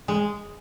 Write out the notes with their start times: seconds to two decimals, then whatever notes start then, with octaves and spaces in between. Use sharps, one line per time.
0.08 G#3